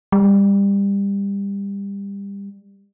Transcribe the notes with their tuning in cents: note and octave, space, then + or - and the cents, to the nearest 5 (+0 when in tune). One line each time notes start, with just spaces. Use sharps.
G3 +25